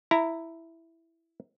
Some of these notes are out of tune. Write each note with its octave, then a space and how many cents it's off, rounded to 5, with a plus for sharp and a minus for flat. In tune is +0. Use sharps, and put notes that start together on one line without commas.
E4 +0 A#5 -15